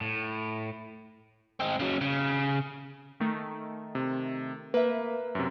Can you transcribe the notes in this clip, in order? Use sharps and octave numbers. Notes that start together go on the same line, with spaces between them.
A2
G#3 C4
C#3 F#3
C#3
D#3 A3
C3
A#3 B4 E5
F#2 C3